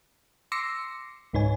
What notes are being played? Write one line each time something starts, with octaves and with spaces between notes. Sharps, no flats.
C6 D6 E6 A#6 C7 C#7
C#2 G#2 D#4 B4 C#5 G#5